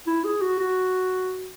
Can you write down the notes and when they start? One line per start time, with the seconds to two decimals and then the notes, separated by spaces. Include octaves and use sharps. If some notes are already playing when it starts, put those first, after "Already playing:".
0.07 E4
0.24 G#4
0.42 F#4
0.59 F#4